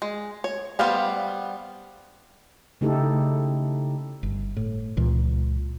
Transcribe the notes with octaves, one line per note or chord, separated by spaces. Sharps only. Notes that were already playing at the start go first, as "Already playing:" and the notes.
G#3
C#5
G3 B3 C5 F5 A5
C#3 A3 D#4 E4 G4 A4
G1
A2
C#2 A#2 E3